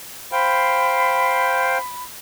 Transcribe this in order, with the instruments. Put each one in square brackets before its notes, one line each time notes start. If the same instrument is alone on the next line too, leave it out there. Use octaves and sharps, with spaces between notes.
[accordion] C5 F5 G5 [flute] B5